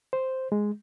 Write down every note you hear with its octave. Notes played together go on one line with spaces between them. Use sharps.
C5
G#3